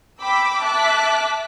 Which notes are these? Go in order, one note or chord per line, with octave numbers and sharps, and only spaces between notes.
G5 B5 D6 E6
E5 A5 D6 F#6 B6